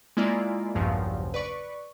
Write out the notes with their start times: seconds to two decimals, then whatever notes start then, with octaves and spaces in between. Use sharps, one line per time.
0.17 G#3 A#3 E4 F4 D5
0.75 A#1 E2 G2 C#3 F3 F#3
1.34 B4 D5 C#6